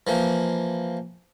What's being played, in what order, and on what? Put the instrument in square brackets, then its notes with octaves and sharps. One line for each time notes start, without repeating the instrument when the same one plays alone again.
[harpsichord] E3 F3 A#3